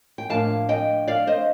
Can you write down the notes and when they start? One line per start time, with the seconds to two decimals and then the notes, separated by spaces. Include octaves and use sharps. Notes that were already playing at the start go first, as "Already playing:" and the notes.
0.18 G5
0.30 A2 F3 A#3 D4 F5 A5
0.69 D#5 G5
1.08 D5 F5
1.27 C5 D#5